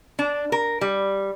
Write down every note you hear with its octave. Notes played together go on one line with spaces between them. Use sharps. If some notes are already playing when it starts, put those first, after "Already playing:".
D4
A#4
G3